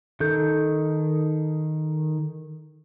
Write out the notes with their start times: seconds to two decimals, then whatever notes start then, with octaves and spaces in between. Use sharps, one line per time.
0.20 D#3 A4 G6